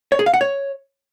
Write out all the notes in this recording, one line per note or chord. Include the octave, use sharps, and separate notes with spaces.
C#5
G#4
F5
F#5
C#5